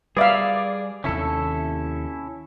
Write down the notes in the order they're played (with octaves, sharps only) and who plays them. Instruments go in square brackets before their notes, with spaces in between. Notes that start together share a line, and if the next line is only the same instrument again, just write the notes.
[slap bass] G3 [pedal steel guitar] G#4 D5 [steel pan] B4 E5 F5
[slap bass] D#2 C3 D#3 [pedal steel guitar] C#4 E4 A4